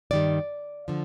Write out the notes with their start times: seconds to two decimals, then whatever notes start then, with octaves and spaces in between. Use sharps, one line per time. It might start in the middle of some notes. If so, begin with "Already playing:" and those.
0.11 G2 D#3 G3 D5
0.88 D3 F3